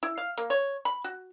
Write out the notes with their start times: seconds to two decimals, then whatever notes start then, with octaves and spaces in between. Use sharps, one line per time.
0.03 E4
0.18 F5
0.38 A#3
0.50 C#5
0.85 B5
1.04 F#4